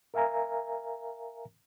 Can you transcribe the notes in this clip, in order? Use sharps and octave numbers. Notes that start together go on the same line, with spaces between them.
A#4 E5 F5 G#5 A#5